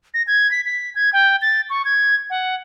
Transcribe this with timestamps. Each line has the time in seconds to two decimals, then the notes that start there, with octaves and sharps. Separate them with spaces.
0.14 A#6
0.27 G#6
0.51 B6
0.66 B6
0.96 G#6
1.13 G5
1.42 A6
1.70 C#6
1.85 G#6
2.30 F#5